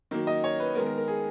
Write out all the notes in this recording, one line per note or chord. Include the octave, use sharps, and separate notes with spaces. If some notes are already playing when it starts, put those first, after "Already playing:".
D#3 F#3 A#3
D#5
C#5
B4
D#3 G#3 B3 A#4
A#4
A#4
G#4